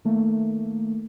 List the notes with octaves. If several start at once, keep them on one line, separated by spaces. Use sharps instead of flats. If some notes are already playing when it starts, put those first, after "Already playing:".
D#3 A3 A#3